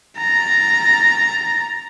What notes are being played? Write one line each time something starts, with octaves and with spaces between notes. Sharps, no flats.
A#5 A6